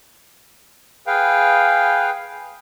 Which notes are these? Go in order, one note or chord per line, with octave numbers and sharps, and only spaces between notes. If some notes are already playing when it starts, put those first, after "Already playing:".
G#4 B4 F5 G5